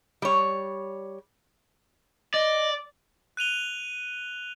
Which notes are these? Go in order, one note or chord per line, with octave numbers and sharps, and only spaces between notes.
G3 C#5
D5 D#5
F#6 D#7 F7 G7